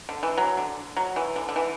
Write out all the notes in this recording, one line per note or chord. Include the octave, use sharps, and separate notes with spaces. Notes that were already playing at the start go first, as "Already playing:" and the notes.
D3
E3
F#3
D3
F#3
E3
D3
D3
E3